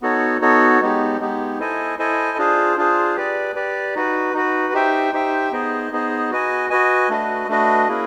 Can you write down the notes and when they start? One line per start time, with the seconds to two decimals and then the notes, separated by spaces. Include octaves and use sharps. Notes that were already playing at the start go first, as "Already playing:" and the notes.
0.02 B3 D#4 F#4 A4 C#5
0.41 B3 D#4 F#4 A4 C#5
0.81 G#3 B3 D#4 G4
1.20 G#3 B3 D#4 G4
1.60 E4 A4 C5 D#5 G#5
1.98 E4 A4 C5 D#5 G#5
2.38 D4 F4 G#4 C5
2.77 D4 F4 G#4 C5
3.16 G4 B4 D5
3.56 G4 B4 D5
3.95 D#4 F#4 B4
4.34 D#4 F#4 B4
4.73 D#4 G4 C5 E5 G5
5.13 D#4 G4 C5 E5 G5
5.52 B3 D#4 G#4 C5 D#5
5.92 B3 D#4 G#4 C5 D#5
6.31 F#4 B4 D#5 G#5
6.70 F#4 B4 D#5 G#5
7.09 A3 D4 F#4 B4 D#5
7.48 A3 D4 F#4 B4 D#5
7.88 A#3 C#4 E4 G#4 B4